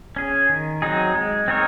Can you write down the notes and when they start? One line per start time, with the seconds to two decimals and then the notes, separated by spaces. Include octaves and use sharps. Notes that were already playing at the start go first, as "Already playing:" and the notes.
0.16 C#4 G#4
0.49 D#3
0.82 F#3 C4 D#4 G#4
1.15 G#3
1.48 C4 D#4 A#4 C#5